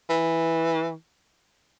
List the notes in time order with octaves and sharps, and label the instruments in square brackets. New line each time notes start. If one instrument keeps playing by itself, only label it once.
[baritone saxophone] E3